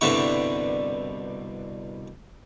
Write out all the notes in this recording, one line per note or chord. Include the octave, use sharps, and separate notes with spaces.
C2 G2 B2 D3 E5 C#6